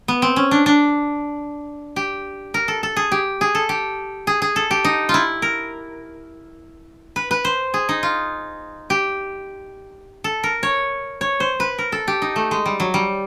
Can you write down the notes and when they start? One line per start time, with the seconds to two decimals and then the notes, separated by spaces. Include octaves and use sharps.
0.08 B3
0.22 C4
0.36 C#4
0.51 D4
0.66 D4
1.96 G4
2.54 A#4
2.68 A4
2.83 A4
2.96 G#4
3.12 G4
3.41 G#4
3.55 A4
3.69 G4
4.27 G#4
4.42 G#4
4.56 A4
4.71 G4
4.85 D#4
5.09 F4
5.14 E4
5.42 A#4
7.16 B4
7.31 B4
7.45 C5
7.74 G#4
7.89 D#4
8.03 F4
8.90 G4
10.24 A4
10.44 A#4
10.63 C#5
11.21 C#5
11.40 C5
11.60 B4
11.78 A#4
11.92 A4
12.08 G4
12.22 D#4
12.36 A3
12.51 G#3
12.66 G3
12.80 F#3
12.94 G3